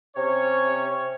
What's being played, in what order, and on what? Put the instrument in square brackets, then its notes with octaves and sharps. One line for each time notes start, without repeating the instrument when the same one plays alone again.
[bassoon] C3 [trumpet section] C#4 C#5